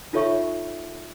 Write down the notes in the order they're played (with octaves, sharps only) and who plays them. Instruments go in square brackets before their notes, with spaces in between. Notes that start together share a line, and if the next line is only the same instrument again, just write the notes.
[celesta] D#4 F4 A4 C#5 E5 C#6